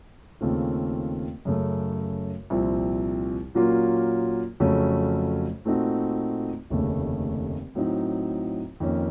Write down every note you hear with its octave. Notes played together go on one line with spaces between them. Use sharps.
D#2 C#3 A3 C4 F4
F#2 C#3 A3
C2 A#2 F3 C4
A#2 F#3 A#3 C#4 F4
F2 C#3 F#3 A3 C#4
A#2 A3 C4 D#4 F#4
F1 D#2 C#3 A3
A2 F#3 C4 D#4
F2 D#3 A#3 C#4